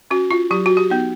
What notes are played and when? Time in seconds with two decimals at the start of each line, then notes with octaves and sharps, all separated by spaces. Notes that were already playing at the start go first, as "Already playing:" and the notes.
0.11 C#4 F#4
0.31 F4
0.51 F#3 G4
0.66 F#4
0.77 G4
0.90 B3 D#4